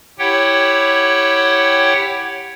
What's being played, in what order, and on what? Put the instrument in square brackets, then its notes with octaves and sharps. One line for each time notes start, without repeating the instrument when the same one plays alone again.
[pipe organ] E4 G4 C#5 F#5 G5